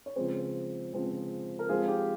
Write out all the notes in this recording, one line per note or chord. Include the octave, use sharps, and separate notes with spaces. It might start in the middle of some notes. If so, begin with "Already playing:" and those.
C#5
C#3 F3 G#3 C4 G#4 C5
C#3 F3 G#3 C4
A#4
F3 G#3 C4 F4 G#4
G4